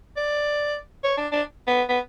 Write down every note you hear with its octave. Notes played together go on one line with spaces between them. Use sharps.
D5
C#5
D4
D4
B3
B3